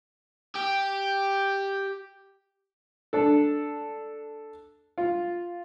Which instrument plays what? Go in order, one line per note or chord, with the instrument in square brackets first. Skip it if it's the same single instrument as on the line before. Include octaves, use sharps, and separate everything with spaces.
[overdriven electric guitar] G4
[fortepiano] D4 A4
F4